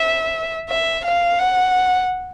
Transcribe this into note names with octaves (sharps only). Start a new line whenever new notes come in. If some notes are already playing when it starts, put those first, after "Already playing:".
Already playing: E5
E5
F5
F#5